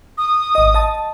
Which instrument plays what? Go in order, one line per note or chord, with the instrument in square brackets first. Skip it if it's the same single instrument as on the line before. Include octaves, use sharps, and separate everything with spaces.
[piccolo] D#6
[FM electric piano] G#1 D#5
D#5 A5